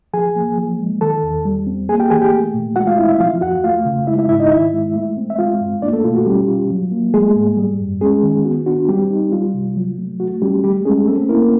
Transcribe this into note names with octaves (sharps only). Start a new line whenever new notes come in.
F3 G#4 G#5
A#3
F3
G#3
D#3 A4 A5
E2
G3
C4
A#3 G#4 G#5
G4 G5
E3 G#4 G#5
G4 G5
A3
A#2
G#3 F#4 F#5
F4 F5
C4 E4 E5
E4 E5
F3 F4 F5
F2 F#4 F#5
A3 F4 F5
C#3
G#3 E4 E5
E4 E5
G#2 E4 E5
D#4 D#5
D#3 E4 E5
G#3
A3
C4
E5
G#3 F4 F5
G2
A#3 D4 D5
A3 A4
B2 F4
F#4
G3 C#4 G4
F4
F#3
A#3
G#3 A3 G#4
G#2
G3
F#2
G#3 C#4 G#4
D#3
B3 F#4
D4 F#4
G3 C4 G4
D#4
G3 F4
C3
F#3
A3
A3 F#4
G3 C#4 G4
G3 A3 G4
G#3 C#4 G#4
A3 C4 A4
A#3 E4 A#4